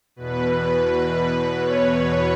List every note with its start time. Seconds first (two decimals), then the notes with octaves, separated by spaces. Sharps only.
0.16 E2 B2 B4
1.58 C#5